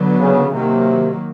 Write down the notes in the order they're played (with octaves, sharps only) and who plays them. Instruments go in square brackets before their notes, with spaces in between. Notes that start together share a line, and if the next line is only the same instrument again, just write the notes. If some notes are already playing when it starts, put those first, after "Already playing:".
Already playing: [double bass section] D3 F#3 B3
[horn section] C#3
[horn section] C3 [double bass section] D#3 F#3 A#3